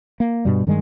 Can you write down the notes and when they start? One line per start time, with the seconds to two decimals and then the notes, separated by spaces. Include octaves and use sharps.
0.20 A#3
0.45 G2 B2 G3
0.67 G2 D#3 G3 G#3